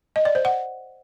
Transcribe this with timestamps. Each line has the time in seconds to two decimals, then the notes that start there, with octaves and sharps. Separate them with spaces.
0.16 D#5
0.25 D5
0.35 C5
0.45 F#5